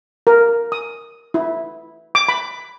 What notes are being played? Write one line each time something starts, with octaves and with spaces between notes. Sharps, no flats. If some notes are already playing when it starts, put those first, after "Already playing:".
A#4
D#6
E4
D6
B5